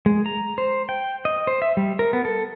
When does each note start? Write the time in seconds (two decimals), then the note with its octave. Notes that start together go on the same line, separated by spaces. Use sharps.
0.06 G#3
0.26 A#5
0.58 C5
0.89 G5
1.25 D#5
1.47 C5
1.62 E5
1.77 G3
1.99 A#4
2.13 B3
2.25 A4